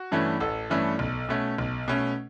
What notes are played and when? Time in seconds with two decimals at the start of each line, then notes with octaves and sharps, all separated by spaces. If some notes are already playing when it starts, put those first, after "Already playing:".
Already playing: F#4
0.12 G2 E3 A3 C#4
0.40 A1 A4
0.70 G2 E3 A3 C#4
0.99 B1
1.29 B2 A3 C#4
1.58 B1
1.88 B2 A3 C#4